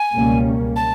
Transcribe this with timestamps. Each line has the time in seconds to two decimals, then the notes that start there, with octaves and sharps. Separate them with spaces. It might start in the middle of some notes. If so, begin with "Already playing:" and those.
Already playing: G#5
0.13 C#2 B2 G3 A#3 C#4
0.76 A5